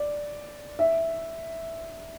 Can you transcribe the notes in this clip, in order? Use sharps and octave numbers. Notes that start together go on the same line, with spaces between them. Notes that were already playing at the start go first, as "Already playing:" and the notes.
Already playing: D5
E5